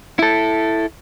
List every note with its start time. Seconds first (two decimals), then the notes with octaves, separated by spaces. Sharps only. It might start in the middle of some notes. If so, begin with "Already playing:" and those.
0.19 E4 A4